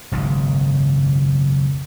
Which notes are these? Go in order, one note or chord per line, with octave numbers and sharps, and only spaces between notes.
F#1 B1 G#2 D#3